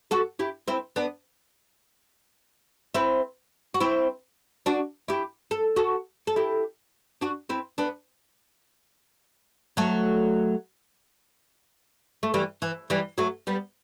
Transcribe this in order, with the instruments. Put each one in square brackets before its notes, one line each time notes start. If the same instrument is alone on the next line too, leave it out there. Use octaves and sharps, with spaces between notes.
[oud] F#4 A4
E4 G4
C4 E4
B3 D4
C4 E4
F#4
C4 E4
D4 F#4
E4 G4
A4
F#4 A4
A4
E4 G4
D4 F#4
C4 E4
B3 D4
F#3 A3
A3
E3 G3
E3
E3 G3
F#3 A3
G3 B3